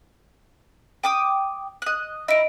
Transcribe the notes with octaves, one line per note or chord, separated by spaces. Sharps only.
G5 D6 D#6
D#5 F#6
D#4 E4 D#5 D7